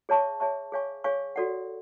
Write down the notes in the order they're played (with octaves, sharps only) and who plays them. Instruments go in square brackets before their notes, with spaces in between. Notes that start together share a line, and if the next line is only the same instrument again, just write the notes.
[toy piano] G#4 C#5 E5 A5 C#6
G#4 C#5 E5 A5 C#6
G#4 C#5 F5 G#5 C#6
G#4 C#5 F5 G#5 C#6
F#4 A4 D5 F#5